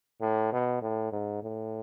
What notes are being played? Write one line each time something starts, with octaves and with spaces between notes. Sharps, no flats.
A2
B2
A2
G#2
A2